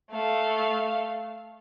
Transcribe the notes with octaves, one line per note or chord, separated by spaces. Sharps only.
A3 F5